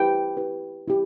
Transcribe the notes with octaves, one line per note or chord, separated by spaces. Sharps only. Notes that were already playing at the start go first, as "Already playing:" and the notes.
Already playing: E4 G4 B4 G5
E4 G4 B4
E4 G4